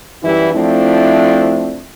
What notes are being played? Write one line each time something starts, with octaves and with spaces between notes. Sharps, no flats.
F#2 E3 G3 E4
F3 A3 C4 D4 E4